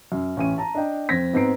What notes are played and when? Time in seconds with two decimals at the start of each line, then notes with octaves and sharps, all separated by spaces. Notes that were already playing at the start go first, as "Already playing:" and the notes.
0.12 F#2
0.37 A1 C#4 D#7
0.58 A5 A#5
0.74 D4 D#5 G5
1.09 F2 C4 C5 G#6 A#6 B6
1.33 G#2 B3 C4 A#5 C7 D7